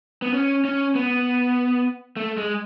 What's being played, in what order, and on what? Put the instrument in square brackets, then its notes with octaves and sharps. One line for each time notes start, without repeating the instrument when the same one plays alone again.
[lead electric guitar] B3
C#4
C#4
B3
A3
G#3